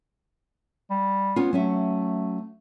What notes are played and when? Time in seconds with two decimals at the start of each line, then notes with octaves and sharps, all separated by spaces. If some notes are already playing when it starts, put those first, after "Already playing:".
0.91 G3
1.36 B3 C#4 F4
1.53 F#3 A3 C#4 E5